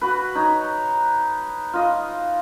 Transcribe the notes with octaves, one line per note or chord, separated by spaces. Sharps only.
F#4 B4
D#4 C#5
F4 D#5